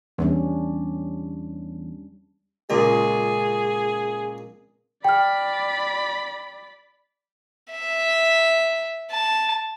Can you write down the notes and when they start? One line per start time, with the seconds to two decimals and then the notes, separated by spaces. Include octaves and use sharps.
0.18 E2 G3 C#4 D4
2.70 C#2 A#2 G#4
5.04 D5 G5 B5 F6
7.72 E5
9.11 A5